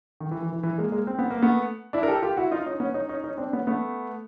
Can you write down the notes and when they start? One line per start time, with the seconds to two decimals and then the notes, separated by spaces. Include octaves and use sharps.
0.20 D#3
0.31 E3
0.43 E3
0.53 E3
0.63 E3
0.78 G#3 A#3
0.92 G#3 A#3
1.07 C4
1.19 B3
1.30 A#3
1.42 A3 B3
1.93 D4 E4
2.03 A#4
2.08 G4 A4
2.22 F4 G4
2.37 E4 F#4
2.51 D#4 F4
2.66 C#4 D#4
2.80 B3 C#4
2.94 C#4 D#4
3.09 C#4 D#4
3.24 C#4 D#4
3.38 C4 D4
3.53 B3 C#4
3.67 A3 B3